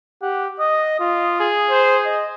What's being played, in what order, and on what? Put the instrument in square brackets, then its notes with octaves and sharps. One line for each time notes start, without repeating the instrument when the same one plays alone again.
[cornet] G4 [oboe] F#5
[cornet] D#5 [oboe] D#6
[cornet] F4
[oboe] G#4
[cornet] C5
D#5